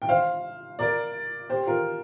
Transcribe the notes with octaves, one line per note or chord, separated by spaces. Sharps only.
G5
C5 F5
A#4 D5
G4 C5
F4 A#4